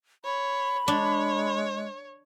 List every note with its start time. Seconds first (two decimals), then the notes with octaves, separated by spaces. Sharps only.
0.25 C#5 B5
0.88 G#3 D4 C#5